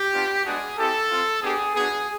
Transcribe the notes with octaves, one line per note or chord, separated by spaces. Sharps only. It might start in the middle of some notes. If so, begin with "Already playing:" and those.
Already playing: G4
B3 D4 F4
G#3 B3 D4 F#4 G#4
C4 E4 G4 A4
C4 F4
B3 D4 G4 G#4
B3 D4 F#4 G#4